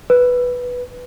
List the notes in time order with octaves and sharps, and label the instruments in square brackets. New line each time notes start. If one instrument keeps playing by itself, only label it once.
[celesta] B4